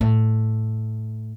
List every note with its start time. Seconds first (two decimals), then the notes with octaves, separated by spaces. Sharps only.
0.01 A2